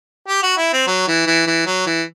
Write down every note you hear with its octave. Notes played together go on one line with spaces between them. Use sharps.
G4
F#4
E4
C4
F#3
E3
E3
E3
F#3
E3